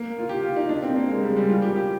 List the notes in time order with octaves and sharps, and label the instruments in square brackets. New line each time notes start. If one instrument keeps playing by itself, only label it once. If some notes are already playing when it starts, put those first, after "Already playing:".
Already playing: [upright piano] A#3
F4
G4
F4
D#4
D4
C4
A#3
G#3
G3
G3
F4
G4
G4